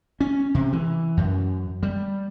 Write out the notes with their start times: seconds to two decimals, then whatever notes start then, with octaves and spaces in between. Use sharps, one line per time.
0.20 C#4
0.55 C3
0.73 E3
1.17 F#2
1.83 G3